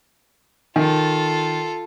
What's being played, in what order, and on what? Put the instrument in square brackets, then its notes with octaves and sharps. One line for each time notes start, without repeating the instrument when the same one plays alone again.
[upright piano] D#3 [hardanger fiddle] F4 A4